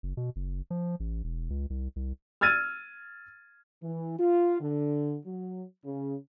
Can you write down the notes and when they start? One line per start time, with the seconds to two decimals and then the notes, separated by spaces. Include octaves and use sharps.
0.03 F#1
0.17 B2
0.36 F#1
0.70 F3
1.00 A1
1.24 E1
1.50 C#2
1.70 C2
1.96 C2
2.41 E6 F6 G#6 A6 D#7
3.83 E3
4.19 F4
4.60 D3
5.26 F#3
5.84 C#3